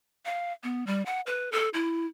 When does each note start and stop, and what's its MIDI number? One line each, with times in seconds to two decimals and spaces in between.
0.26 0.52 77
0.63 0.86 59
0.87 1.04 55
1.06 1.21 78
1.27 1.49 71
1.52 1.69 69
1.74 2.06 64